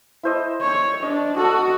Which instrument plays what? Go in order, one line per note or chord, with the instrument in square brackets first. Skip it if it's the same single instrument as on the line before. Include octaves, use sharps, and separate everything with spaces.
[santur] E4 C5 D#5
[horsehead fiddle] C#5
[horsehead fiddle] D4 [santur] D#5
[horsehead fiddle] F#4 [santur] A4 D#6